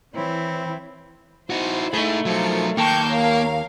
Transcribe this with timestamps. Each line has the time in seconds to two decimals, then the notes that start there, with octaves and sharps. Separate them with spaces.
0.13 E3 C4 E4 C#5
1.50 D#4 E4 F#4 C5
1.93 A3 D#4 G#4 B5
2.25 F3 F#3 D#4 F4 A#4 C#7
2.77 D#2 A#3 G5 A5 C#6 G6
3.10 A#4 C#5 F5